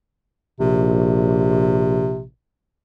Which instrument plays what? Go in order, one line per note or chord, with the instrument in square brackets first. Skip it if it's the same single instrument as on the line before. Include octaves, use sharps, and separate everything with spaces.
[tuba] A#1 [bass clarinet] C3